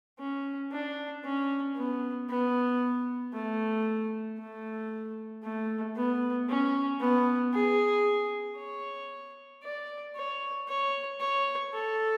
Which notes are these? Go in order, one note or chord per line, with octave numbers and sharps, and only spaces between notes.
C#4
D4
C#4
B3
B3
A3
A3
A3
B3
C#4
B3
G#4
C#5
D5
C#5
C#5
C#5
A4